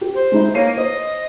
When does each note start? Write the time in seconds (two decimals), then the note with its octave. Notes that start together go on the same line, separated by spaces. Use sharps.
0.01 G4
0.15 C5
0.32 G#3 D#4 E4
0.54 A#3 C#5 C7 D#7
0.77 C5 D#5